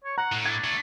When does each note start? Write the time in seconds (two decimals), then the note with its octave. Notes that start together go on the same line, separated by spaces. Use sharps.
0.04 C#5
0.18 F#5 A#5
0.32 A2
0.45 D4 G#6
0.64 A3 F#4